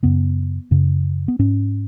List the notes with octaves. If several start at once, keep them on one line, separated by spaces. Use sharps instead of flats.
F#2 C#3 B3
F#2 C#3
B3
G#2 C#4